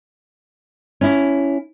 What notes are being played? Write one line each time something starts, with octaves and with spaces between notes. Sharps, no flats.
C#4 E4